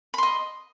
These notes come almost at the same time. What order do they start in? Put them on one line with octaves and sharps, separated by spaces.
B5 C6 D#5